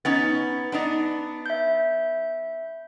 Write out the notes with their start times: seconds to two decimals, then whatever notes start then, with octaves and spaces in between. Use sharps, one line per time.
0.05 B3 C#4 D#4 A6
0.72 B3 D4 D#4
1.46 E5 G6